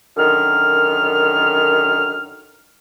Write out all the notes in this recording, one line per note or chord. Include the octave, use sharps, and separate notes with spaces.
F#2 D3 D#3 F6